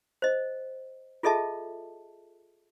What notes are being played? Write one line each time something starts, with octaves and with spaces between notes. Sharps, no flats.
C5 D#5
F4 G#4 A4 D#5 E5 A5